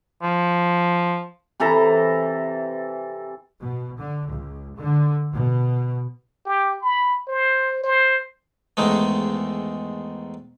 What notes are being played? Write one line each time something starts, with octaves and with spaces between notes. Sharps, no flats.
F3
C3 E3 A4 A#5
B2
D3
C#2
D3
B2
G4
B5
C5
C5
E2 G#2 D#3 G#3 A3